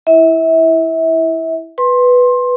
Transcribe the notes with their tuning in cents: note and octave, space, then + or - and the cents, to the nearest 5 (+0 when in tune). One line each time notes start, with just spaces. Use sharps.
E4 +0 E5 -30
B4 +0 C6 +20